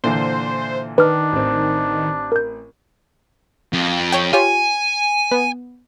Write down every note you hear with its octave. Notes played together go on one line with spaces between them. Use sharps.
A#2 D3 E3 C5
D#3 D4 B4 F6
A1 C4
A#4 G6
F2
C#5 G5
F4 G4 C#5 G#5
B3